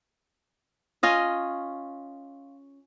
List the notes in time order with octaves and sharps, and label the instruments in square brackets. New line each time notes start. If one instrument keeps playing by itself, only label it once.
[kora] C#4 F4 D#5